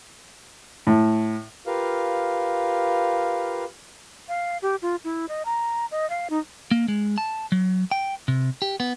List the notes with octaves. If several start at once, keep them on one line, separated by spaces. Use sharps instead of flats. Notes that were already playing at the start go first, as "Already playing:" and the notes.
A2
F4 G4 A#4 B4 F5
F5
G4
F4
E4
D#5
A#5
D#5
F5
D#4
A#3
G#3
A5
F#3
G5
C3
G4
B3